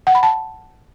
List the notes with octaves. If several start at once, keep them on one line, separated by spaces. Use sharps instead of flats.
F#5
B5
A5